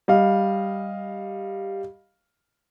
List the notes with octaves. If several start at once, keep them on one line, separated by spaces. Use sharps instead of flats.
G3 D#5 F5